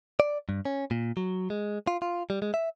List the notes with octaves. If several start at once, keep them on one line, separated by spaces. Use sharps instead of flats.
D5
G2
C#4
A#2
F#3
G#3
F4
F4
G3
G#3
E5